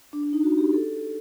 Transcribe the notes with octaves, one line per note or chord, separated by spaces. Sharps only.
D4
D4
D#4
F#4
G4
A4